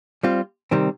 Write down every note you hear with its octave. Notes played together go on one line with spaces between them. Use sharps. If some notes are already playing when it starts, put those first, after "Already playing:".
G3 C4 F4
C3 D#3 G3 C4